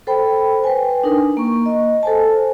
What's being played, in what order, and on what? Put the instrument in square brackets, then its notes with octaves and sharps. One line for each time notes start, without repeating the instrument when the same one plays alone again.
[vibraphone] A4 C5 G5 B5
B4 G5 G#5
D4 D#4 A#4
A#3 C#6
D#5
A4 C5 G#5 A5